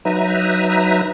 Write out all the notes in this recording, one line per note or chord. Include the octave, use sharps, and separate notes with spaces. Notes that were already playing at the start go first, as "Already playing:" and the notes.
F#3 D#4 B4 E5 A#5